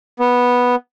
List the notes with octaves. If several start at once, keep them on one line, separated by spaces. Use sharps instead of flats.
B3